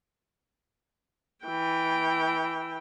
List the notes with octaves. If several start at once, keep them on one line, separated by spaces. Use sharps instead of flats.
E3 G5